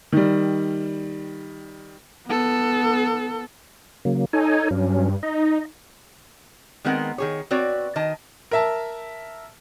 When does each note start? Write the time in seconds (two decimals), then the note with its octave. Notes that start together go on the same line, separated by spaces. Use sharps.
0.12 D#3 G3
2.27 B3 A4
4.05 C#3 F#3 A#3
4.33 D#4 A4 C#5 G#5
4.71 G2 F#3 C#4
5.23 D#4 D#5
6.85 D#3 G#3 B3 C4 A#4 F#5
7.18 D#3 G#4 C#5
7.51 C4 F#4 B4 C#5 D5
7.96 D#3 D#5 A5
8.51 A#4 E5 A5